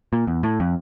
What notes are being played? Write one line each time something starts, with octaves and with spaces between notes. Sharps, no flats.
A#2
E2
A2
F2